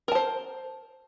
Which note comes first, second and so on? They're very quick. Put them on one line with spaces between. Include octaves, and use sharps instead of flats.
A#4 A5 C5